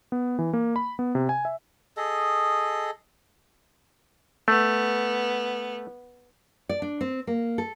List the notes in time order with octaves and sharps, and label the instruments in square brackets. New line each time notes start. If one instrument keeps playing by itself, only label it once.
[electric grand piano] B3
E3
A#3
B5
B3
C3
G#5
E5
[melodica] G#4 A4 D#5
[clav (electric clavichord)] A3 [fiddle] B3
[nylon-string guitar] D5
D4
C4
A#3
A4